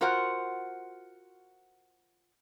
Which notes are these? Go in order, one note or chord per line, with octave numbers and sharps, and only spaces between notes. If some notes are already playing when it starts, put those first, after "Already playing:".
F4 F#4 A#4 C5 F#5